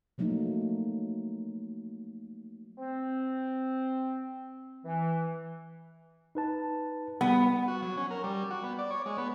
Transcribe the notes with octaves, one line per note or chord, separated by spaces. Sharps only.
F3 F#3 A3 A#3 D#4
C4
E3
D#4 B4 A5
G3 B3 B5
F#4
F#3
C#4
A#4
G3
F#4
B3
D5
C#5
G#3
B3